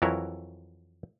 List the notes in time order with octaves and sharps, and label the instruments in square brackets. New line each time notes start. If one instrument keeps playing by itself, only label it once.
[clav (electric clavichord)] F2 E3 F#3 E4 A#4 C#5